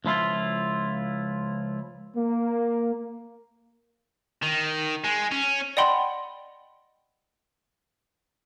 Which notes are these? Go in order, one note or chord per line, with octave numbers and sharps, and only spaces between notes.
C#2 F3 E4 F4
A#3
D#3
G#3
C#4
D5 D#5 F#5 G5 B5 C6